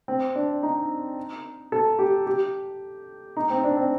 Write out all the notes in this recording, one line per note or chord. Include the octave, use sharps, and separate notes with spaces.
C4
D4
D#4
A4
G4
G4
D#4
C4
D4
C4